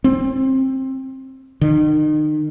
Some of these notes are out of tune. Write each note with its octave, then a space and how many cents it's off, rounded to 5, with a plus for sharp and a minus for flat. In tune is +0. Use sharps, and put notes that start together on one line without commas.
C4 +15
D#3 -35